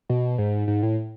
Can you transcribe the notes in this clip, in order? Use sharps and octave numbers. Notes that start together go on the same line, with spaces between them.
B2
G#2
G#2
A2